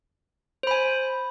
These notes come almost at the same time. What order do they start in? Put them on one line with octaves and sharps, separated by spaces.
C5 B5 G#5